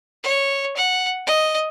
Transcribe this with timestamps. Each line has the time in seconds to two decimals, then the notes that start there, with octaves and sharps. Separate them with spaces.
0.23 C#5
0.76 F#5
1.27 D#5